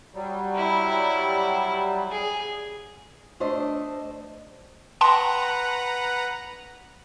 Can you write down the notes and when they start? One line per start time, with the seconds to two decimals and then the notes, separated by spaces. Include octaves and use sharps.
0.14 F#3 G3
0.55 E4
2.11 G#4
3.40 A3 D4 C5 D#5
5.01 B4 F#5 G5 A5 A#5 C6